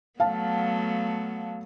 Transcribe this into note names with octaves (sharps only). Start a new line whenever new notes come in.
F#3 A3 B3 F5 A5